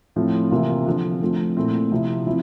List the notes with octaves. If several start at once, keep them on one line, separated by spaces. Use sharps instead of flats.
A2 F3 C4
C3 E3 A#3 F4
D3 F3 C4
F3 A3 C4
A#2 A3 C4 E4
C3 F3 C4 E4
F3 C4 E4